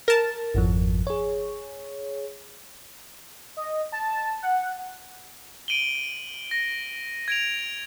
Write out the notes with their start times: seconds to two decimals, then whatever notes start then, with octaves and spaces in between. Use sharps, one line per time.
0.08 A#4 A5
0.54 G#1 F2 F3
1.07 G#4 C#5
3.57 D#5
3.92 A5
4.42 F#5
5.68 D7 D#7 F#7 G7
6.51 A#6
7.28 G#6 D7 F7